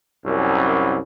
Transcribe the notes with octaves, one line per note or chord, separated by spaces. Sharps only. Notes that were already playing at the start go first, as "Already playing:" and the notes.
C2 F#2